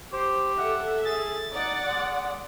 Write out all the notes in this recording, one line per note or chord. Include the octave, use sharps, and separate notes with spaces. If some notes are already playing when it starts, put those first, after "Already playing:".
G4 C5
A4 E5 F#5
G#4 A6
D#4 D5 F#5
G#3